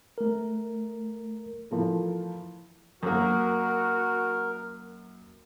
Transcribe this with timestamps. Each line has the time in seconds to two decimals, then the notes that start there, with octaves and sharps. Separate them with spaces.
0.18 A3 A#4
1.71 E3 F3 A3 A#4
3.03 F#2 A#3 F#4 A#4